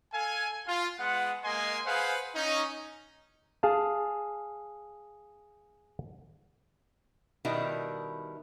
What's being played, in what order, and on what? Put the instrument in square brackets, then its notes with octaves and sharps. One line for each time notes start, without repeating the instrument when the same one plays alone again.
[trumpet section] A4 F5 G#5
F4
G#3 B3 F#5
G#3 A#3 D#5 G#5 C6
G#4 B4 C5 F5 F#5
C#4 D#4
[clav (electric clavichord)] G#4 F5 A5
[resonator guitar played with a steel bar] B2 D#3 G3 E4